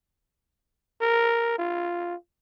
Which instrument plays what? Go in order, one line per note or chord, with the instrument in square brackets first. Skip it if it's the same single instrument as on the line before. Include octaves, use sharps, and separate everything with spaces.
[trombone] A#4
F4